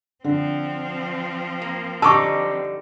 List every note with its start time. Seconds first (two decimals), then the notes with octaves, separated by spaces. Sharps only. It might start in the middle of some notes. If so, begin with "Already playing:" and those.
0.24 D3 F3 C4
1.62 A#3
2.02 D3 G3 D#4 A5 C#6 D6 E6